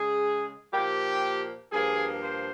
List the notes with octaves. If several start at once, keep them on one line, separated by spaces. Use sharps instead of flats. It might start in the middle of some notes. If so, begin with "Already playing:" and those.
Already playing: C#3 G#3 G#4
A#2 F3 A#3 G4
G2 F3 A#3 G#4
C5